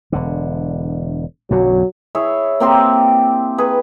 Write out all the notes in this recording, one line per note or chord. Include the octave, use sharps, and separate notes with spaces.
E1 D3
B1 F#2 D3 F#3
E4 G#4 C#5 E5
A#3 C4 G4 C6
G#4 B4